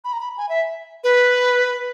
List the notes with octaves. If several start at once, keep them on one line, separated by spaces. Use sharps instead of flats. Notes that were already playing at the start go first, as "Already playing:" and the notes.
B5
A#5
B5
G#5
E5
B4